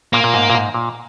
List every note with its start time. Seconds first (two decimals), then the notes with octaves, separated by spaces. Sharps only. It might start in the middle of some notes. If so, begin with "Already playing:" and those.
0.13 A#2 A#3
0.24 A#2
0.34 G#2
0.50 A#2
0.55 G#2
0.74 A#2